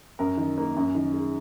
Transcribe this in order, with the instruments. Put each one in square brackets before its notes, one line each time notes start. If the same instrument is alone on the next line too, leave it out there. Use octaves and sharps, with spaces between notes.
[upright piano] F#2 A#4
D#3
A#3
F#2
D#3
G#3